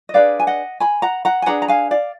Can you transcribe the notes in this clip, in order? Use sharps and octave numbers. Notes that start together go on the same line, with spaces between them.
D#5
D4 G#4 B4 D5 F5
G#5
D#5 F#5
G#5 B5
F#5 A#5
F#5 A#5
G#5
D4 G#4 B4 F#5 A#5
A#5
F5 G#5
D5 F5